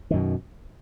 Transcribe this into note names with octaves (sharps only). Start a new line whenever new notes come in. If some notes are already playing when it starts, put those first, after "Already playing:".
F#2 B2 D#3